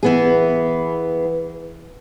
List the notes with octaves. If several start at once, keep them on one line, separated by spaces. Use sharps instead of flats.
E3 B3 G#4